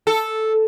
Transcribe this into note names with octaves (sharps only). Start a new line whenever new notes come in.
A4